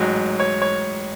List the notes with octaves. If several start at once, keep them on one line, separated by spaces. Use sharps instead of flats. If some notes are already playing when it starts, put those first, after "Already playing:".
Already playing: A1 G#2 F#3
C#5
C#5